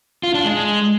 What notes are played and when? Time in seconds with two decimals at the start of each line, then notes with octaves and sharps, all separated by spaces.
0.23 F4
0.34 D4
0.45 G#3